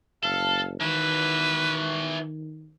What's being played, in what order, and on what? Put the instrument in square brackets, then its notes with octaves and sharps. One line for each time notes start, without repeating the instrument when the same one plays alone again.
[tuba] F#1 [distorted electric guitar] A4 [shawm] F5
[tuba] D#3 [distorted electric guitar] E3 F#4 [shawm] B4